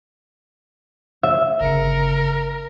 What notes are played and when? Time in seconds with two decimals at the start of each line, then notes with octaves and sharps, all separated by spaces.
1.23 E5
1.60 G1 C#3 A#4 C#7